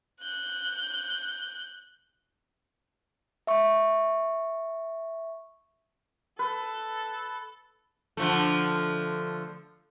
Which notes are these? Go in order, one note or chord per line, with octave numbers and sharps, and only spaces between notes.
F#6 G6
E5 C#6
A4 B4
D3 F3 A3